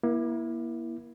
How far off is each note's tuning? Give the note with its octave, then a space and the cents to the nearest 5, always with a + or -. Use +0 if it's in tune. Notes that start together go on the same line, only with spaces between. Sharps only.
A#3 +35 E4 +0